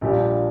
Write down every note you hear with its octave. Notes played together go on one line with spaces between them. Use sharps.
A#1 A#2 G3 D4 G4